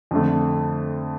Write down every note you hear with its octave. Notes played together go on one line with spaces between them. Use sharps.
F2 D3 A3